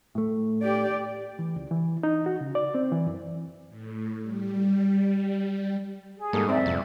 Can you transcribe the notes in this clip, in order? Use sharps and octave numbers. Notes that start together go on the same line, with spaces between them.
A2 A3
G4 D5
E3
C#2
E3
D#4
F#4
C#3
D5
C4
E3
F#2
A2
G3
G#4
G#2 G3 A#3 A4
F#2 C4 D5 E5
C2 F2